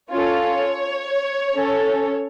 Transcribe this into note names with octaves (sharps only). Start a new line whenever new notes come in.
C#4 F4 A4 C#5
C#4 A4